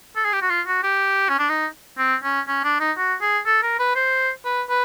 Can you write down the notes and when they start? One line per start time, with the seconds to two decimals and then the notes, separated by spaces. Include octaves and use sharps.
0.16 A4
0.25 G#4
0.33 G4
0.42 F#4
0.49 F4
0.67 F#4
0.83 G4
1.29 C#4
1.39 D4
1.49 D#4
1.98 C4
2.23 C#4
2.47 C#4
2.64 D4
2.80 D#4
2.97 F#4
3.21 G#4
3.46 A4
3.62 A#4
3.79 B4
3.95 C5
4.44 B4
4.69 B4